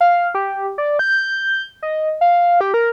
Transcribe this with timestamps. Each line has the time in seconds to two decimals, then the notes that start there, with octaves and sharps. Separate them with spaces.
0.01 F5
0.35 G4
0.78 D5
0.99 G6
1.83 D#5
2.21 F5
2.61 G4
2.74 A#4